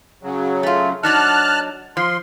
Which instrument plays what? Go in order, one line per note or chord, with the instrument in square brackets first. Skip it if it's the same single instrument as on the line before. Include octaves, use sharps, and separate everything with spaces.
[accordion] C#3 F#3
[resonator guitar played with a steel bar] A3 F4
[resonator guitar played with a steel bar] F#3 D4 D#4 [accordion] A5 F6 F#6
[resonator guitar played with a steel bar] F3 [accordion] C6